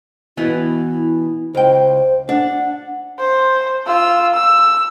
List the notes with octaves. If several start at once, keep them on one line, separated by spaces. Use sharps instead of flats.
B2 E3 B3 E4
C#2 C5 G5
D4 F#5
C5
F4 E6
E6